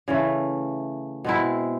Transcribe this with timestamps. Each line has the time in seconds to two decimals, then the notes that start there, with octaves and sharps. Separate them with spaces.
0.08 C#3 E3 A3
1.25 B2 G#3 C4 E4